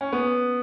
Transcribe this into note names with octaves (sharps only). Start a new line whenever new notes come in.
C#4
B3